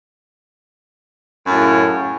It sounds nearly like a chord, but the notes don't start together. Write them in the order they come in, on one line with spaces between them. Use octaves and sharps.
F#2 A2 C#3